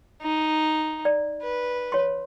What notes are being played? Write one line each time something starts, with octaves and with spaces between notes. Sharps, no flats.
D#4
D5
B4
C#5 C6